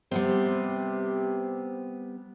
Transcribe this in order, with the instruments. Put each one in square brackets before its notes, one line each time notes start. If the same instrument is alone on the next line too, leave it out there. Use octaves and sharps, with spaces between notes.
[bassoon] C3 [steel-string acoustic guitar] G3 B3 C4